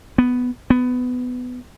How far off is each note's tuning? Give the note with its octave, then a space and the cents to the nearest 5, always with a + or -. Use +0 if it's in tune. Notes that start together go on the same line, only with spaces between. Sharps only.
B3 +5
B3 +15